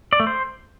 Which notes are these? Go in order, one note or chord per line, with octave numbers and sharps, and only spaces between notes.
D5
A3
C5